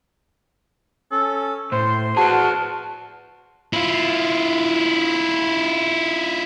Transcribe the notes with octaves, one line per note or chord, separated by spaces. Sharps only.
C#4 A4
A2 C5 C6
F#4 G#4 B4 A5
E4 F4